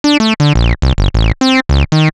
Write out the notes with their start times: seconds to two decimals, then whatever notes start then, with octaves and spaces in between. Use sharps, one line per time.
0.04 D4
0.20 A3
0.40 D3
0.55 A#1
0.82 C2
0.98 G1
1.14 A1
1.41 C4
1.69 C#2
1.92 D#3